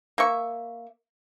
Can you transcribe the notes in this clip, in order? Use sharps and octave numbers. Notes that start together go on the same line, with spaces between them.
A#3 E5 C#6